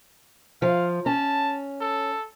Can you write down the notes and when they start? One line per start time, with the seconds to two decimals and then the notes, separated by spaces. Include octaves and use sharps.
0.62 F3 F5
1.06 C#4 A5
1.81 A4